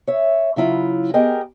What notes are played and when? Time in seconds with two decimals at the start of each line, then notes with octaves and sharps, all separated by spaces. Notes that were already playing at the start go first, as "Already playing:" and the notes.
0.07 C#5 E5
0.56 C#3 F#3 E4 F4
1.14 B3 G4 G#4 A#4 D#5 G5